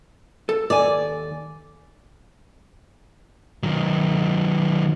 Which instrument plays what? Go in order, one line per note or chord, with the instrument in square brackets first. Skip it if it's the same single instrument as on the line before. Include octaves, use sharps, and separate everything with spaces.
[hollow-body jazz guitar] A4
[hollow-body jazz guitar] D#2 A4 G#5 [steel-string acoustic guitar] D5
[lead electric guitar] D#3 F#3